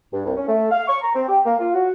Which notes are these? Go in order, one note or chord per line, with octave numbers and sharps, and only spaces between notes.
G2
C2
C#4
A3
F5
C#6
A#5
C4
G4
A#3
F4
F#4